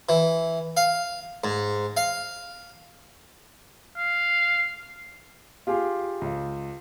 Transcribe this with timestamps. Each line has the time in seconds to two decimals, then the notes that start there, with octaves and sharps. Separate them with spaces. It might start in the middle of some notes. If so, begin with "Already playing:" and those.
0.09 E3
0.77 F5
1.44 G#2
1.97 F5
3.98 F5
5.67 F4 G4 G#4
6.21 C#2